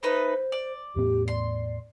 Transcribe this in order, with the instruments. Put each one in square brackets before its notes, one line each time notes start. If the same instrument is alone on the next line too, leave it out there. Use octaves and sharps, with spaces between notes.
[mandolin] A3 D#4 B4 [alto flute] C5
[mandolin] D5
[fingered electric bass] E2 A2 B3 [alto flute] G4
[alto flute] D5 [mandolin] C6